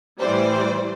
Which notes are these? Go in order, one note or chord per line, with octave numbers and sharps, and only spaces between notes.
A2 E3 G3 C5 D5